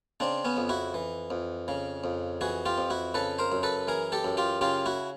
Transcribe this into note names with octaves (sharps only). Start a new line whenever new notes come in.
C#3 C4 D4
B3 C#4
F2
E4 F#4
E3
F2
C#3
F2
E3 F#4 G#4
F4 G4
F2
E4 F#4
C#3 A4 B4
A#4 C5
F#2
A4 B4
E3 G#4 A#4
G4 A4
F#2
F4 G4
C#3 F4 G4
E4 F#4